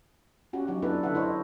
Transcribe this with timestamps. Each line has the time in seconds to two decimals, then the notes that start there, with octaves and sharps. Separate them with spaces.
0.53 C#4 F#4 G4
0.67 F#3 D#4 F#4
0.82 B3 D4 E4 A4 B4
1.03 D3 A4 E5 F#5
1.15 E4 C5 C#5 D#5